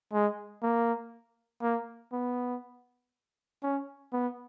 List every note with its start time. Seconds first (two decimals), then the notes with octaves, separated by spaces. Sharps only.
0.13 G#3
0.63 A#3
1.62 A#3
2.13 B3
3.63 C#4
4.13 B3